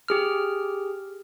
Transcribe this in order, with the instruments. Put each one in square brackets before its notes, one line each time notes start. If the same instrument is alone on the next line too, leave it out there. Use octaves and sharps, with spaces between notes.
[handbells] G4 G#4 F6